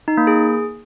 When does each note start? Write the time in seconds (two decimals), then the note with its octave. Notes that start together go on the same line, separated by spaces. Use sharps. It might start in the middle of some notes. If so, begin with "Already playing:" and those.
0.08 D#4
0.17 A#3
0.27 G#4